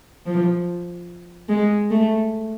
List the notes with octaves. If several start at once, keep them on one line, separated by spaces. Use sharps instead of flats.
F3
G#3
A3